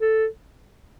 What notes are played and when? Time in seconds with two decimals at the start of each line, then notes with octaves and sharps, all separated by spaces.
0.01 A4